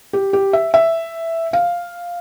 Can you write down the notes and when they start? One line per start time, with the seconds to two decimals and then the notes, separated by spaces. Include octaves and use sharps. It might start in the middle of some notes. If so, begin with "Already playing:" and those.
0.13 G4
0.33 G4
0.53 E5
0.74 E5
1.53 F5